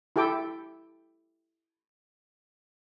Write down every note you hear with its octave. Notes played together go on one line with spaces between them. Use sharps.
E4 G4 A4 G5 D6